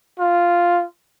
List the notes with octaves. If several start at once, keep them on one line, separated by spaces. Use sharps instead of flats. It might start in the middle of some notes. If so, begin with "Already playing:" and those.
F4